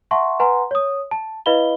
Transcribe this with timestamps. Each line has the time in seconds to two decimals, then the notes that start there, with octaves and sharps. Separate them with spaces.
0.11 E5 F#5 A5 C6 C#6
0.40 B4 F#5 G#5 A#5 C6
0.71 C#5 D#6
1.11 A5
1.46 E4 B4 D#5 F5 B5 G7